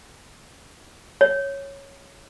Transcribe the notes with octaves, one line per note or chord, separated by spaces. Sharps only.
C#5